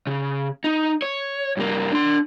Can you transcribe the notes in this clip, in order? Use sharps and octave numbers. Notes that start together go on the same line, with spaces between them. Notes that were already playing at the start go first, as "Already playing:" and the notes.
C#3
D#4
C#5
G2 A#3
D4 C6